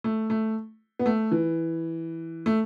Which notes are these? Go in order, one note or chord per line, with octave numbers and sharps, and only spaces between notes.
A3
A3
B3
A3
E3
A3